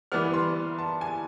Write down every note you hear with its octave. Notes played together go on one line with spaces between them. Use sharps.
E3 G3 B3 F6
C6
A5
G#5